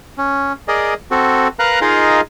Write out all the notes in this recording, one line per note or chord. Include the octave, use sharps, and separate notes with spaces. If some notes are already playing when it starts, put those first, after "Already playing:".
C#4
G#4 A#4 D5 D#5
C4 F#4 A4
A#4 B4 F5 A#5 F#6
D#4 F4 G#4 A#4 D#5 F5